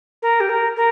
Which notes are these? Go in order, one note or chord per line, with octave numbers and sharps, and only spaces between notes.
A#4
G4
A#4
A#4